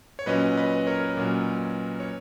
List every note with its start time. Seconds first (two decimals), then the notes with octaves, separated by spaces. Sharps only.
0.19 C#5
0.26 A#2 F#3 C#4 B4 D#5
0.57 B4 D#5
0.87 A#4 C#5
1.17 A#2 F#3 C#4
2.00 C#5